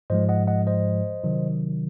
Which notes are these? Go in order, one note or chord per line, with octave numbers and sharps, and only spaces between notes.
G#2 F3 G#3 C5 D#5
D#5 F#5
D#5 F#5
C5 D#5
C3 D#3 F#3